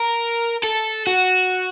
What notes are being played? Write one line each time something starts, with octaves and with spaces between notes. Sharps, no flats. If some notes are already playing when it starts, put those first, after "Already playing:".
Already playing: A#4
A4
F#4